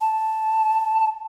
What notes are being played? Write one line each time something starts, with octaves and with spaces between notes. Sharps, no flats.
A5